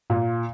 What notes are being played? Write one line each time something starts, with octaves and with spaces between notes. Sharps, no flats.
A#2